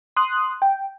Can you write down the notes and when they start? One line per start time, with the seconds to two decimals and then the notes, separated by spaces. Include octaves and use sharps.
0.16 C6 D#6 F#6
0.62 G5